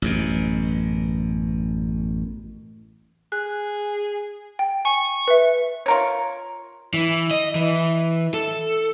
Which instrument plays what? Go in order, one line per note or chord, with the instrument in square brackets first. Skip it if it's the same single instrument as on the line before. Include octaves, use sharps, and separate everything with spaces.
[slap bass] A1 F#2 B2
[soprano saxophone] G#4 [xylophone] F#6
[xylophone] G5
[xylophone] G#5 [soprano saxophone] C#6
[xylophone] B4 E5
[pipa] F4 A#4 C#5
[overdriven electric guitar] E3
D#5
E3
A4